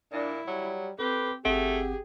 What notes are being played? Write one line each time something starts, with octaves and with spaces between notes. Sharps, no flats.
A#2 D4 E4
F#3 G3
C4 G4 A4 B4
G1 A3 C4 G4 G#4 F#5